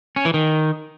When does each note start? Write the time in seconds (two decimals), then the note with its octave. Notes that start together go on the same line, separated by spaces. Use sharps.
0.16 C#4
0.25 E3
0.34 D#3